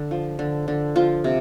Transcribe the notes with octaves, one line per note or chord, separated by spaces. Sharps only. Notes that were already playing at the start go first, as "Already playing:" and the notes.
Already playing: D3
F3
D3
D3
F3 F4
C3